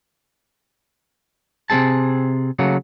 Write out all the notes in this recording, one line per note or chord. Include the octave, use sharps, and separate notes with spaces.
C3 A#3 C4 G#4 A5
C#3 F#3 A3 A#3